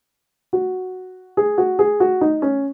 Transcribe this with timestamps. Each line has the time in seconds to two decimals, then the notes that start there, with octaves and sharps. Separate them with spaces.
0.53 F#4
1.37 G#4
1.58 F#4
1.79 G#4
2.00 F#4
2.21 D#4
2.42 C#4